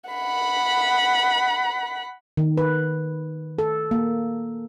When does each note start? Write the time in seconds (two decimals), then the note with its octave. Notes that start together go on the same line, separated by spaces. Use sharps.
0.10 F#5 B5
2.37 D#3
2.57 B4
3.59 A4
3.91 A#3